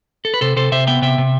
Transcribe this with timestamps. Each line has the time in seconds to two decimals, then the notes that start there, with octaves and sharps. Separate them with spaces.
0.25 A4
0.34 B4
0.41 C3 A4 C5
0.56 C3 A4 C5
0.72 C3 C5 E5
0.87 B3 E5 G5
1.02 C3 E5 G5
1.18 C3